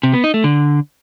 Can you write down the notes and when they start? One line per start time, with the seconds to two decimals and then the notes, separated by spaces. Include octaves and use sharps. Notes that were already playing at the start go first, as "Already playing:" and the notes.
0.03 C3
0.14 B3
0.24 D#4
0.34 A3
0.44 D3